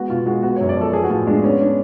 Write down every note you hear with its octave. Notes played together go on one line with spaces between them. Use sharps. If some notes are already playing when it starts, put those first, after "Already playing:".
Already playing: G#3 B3 F#4
B2 F4
G#3 F#4
B3 F#4
C#5
F#2
D5
F3 A4
B3 G#4
F#4
A2 F4
G#3 D4
B3 C#4
D4